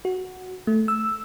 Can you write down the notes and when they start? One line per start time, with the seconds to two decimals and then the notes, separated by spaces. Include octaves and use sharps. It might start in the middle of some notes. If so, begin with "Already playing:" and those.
0.05 F#4
0.67 A3
0.88 E6